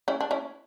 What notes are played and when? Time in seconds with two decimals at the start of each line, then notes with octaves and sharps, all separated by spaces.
0.08 C#4 E4
0.21 D4
0.31 C#4 E4